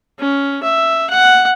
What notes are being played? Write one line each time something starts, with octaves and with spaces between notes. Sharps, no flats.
C#4
E5
F#5